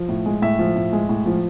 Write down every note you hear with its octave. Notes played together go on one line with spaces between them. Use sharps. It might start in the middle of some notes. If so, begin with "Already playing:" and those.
Already playing: F3
A2
G#3
A2 E5
F3
A2
G#3
A2
F3